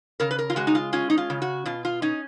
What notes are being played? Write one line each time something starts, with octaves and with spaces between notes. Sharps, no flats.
C#3 A#4
B4
A#4
F4
G#3 F#4
D#4
F4
C#4 F4
D#4
F4
C#3
F#4
B2 F4
F4
C#4 D#4